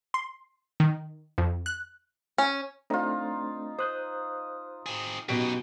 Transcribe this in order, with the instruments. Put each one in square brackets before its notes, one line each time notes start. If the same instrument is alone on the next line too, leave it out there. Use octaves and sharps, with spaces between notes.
[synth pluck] C6
D#3
F2
F#6
[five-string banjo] C#4
[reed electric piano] A3 C4 D4 [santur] D#4 F4
[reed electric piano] C5 F#6 G6 [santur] D#6
[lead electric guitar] C4 G#4
[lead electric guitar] F#2 D#4 [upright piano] B2 D7 [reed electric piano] G4